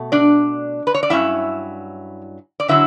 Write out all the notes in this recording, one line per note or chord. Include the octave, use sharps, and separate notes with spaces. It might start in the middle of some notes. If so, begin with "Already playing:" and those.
Already playing: B2 A3
D4 D5
B4
C#5
D5
G2 F#3 C#4 E4 E5
D5
D3 F#3 E4 E5